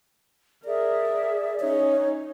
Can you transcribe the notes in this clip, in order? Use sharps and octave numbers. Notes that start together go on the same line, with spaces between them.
G#4 A#4 D5 E5
C#4 D#4 C#5